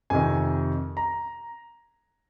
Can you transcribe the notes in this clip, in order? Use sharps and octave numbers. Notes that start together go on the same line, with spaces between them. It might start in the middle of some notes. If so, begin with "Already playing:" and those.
F2 C3 D#3 G#5
A#5